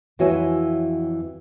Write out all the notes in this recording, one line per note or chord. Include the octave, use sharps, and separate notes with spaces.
F2 E3 F#4 C#5 E5 G#5